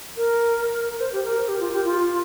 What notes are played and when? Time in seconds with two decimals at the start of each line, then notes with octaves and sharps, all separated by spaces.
0.17 A#4
0.88 A#4
1.00 C5
1.12 G4
1.24 A#4
1.48 G4
1.60 F4
1.73 G4
1.85 F4